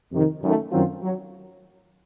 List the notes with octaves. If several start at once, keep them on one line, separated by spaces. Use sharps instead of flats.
F2 C3 D#3
F#2 D#3 A3
F#2 D#3 F#3 C4 F4
F#3